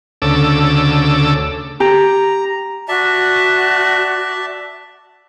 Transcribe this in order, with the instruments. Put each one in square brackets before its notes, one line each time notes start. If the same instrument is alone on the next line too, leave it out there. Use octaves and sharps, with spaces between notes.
[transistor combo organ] D2 C#3 A4 D6 E6
[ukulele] G4 [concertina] A#5
[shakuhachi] F#4 [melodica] D5 E5 A5